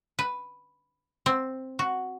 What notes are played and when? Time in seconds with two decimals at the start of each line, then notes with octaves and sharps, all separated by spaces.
0.19 B4
1.26 C4
1.79 F#4